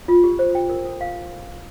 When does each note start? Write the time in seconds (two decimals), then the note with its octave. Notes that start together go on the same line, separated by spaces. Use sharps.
0.08 F4
0.24 G4
0.39 C5
0.55 G5
0.69 A#4
0.85 A4
1.01 F5